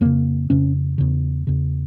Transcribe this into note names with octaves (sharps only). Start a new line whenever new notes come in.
F2 C#3 A#3
F2 C#3 C#4
E2 C#3
E2 C#3